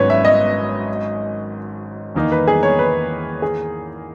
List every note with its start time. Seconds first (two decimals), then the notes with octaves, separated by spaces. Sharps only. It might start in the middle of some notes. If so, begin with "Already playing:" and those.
Already playing: G#1 G#2 F#3 C#4 B4 C#5
0.10 E5
0.25 D#5
2.15 E2 D#3 A#3 D#4
2.32 B4
2.47 G#4
2.63 C#5
2.79 B4
3.42 G#4